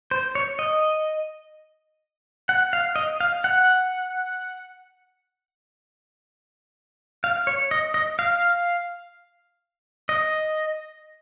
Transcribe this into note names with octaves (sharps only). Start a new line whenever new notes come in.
C5
C#5
D#5
F#5
F5
D#5
F5
F#5
F5
C#5
D#5
D#5
F5
D#5